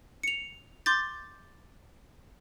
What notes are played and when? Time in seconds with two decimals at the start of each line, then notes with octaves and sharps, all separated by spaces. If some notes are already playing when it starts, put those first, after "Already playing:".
0.23 C#7 F7
0.86 C6 D6 G6 A6